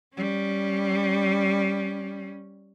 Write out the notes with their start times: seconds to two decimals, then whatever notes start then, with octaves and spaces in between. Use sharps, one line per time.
0.14 G3 C#4